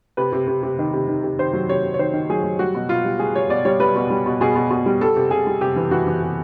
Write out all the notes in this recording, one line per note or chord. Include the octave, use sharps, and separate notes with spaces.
C3 B4
C3
C3
C3
D#3
C3
D#3
C3
D#3 C5
F#3
C3 C#5
C3
C#5
D#3 C5
D#3
F#3 G#4
F#3
G3 F#4
B2
B2 F4
G3
G3 G#4
G3 C#5
B2 D5
G3 C#5
G3 B4
B2
G3
B2
B2 G#4
B2
B2
G3
G3 A4
C3
C3 G#4
G3
C3 G4
E3
E3 F#4
E3
C3